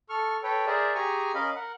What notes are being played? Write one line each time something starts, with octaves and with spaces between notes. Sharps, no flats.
A4 C#6 F6
A4 B4 C#5 G5
G#4 A#4 C5 D5 E5
G4 G#4 G#5 A#5 C#6
C#4 A#4 D#5 F5 B5
A#4 F#5